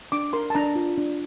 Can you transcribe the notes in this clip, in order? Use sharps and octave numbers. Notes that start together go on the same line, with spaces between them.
D4 D6
A#4 C6
A5
D4 A#5
F4
D4